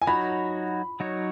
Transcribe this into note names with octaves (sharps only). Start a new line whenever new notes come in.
G#5
F#3 D#4 F#4 C#5 B5
F#3 D#4 F#4 C#5